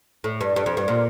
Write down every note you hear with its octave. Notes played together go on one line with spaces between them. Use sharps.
A2
G2
G2
F2
G2
A#2